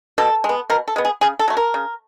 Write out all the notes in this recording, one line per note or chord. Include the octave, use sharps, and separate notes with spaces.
B2 A4
G#3
B3
B2 A#4
A4
G#3 B3
G#4
C#3 G#4
A4
F#3 A3
A#4
C#3